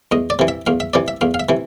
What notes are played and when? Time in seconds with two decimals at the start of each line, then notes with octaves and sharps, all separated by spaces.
0.12 E2 D#5
0.30 D5
0.39 C3 E3
0.48 E5
0.67 E2 F5
0.80 E5
0.94 C3 E3 D5
1.08 E5
1.21 E2 F5
1.34 F5
1.40 E5
1.49 C3 E3